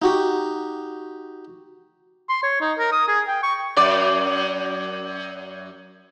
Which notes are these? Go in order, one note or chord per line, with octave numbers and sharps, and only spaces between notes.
D#4 F#4 G4
C6
C#5
D#4
A#4
D#6
G#4
G5
C#6
F#2 D5